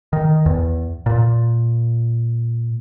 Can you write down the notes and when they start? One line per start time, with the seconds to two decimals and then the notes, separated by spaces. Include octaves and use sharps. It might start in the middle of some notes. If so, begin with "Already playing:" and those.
0.13 D#3
0.46 E2
1.06 A#2